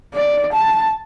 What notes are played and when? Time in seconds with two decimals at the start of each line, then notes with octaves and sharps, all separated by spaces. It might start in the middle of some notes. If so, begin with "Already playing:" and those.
0.14 D5
0.53 A5